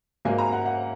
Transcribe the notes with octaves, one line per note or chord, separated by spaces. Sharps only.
G#2 F#3 A#3 G#5
A#5
F#5
F#5